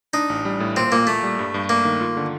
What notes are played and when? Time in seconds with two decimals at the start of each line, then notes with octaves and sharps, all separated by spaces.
0.14 D4 D#4
0.30 A1
0.45 G3
0.60 A2
0.76 A#2 C4
0.92 A#2 A#3
1.07 A3 A#3
1.23 G3
1.39 G2
1.54 G2
1.69 A3 A#3
1.85 D#3
2.01 F4
2.17 D3